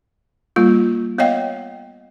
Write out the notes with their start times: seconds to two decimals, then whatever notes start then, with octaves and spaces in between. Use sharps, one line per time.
0.56 G3 A#3 F4
1.18 B3 C#5 D#5 F5 G5